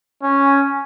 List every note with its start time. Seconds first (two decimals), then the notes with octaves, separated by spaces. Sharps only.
0.23 C#4